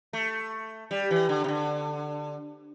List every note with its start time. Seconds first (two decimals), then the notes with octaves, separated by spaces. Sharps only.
0.13 A3
0.91 G3
1.11 E3
1.29 D3
1.44 C3
1.48 D3